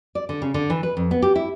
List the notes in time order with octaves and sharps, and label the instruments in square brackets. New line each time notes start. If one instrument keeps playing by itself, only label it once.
[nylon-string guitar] D5
D3
C#3
D3
E3
B4
F2
B3
G4
E4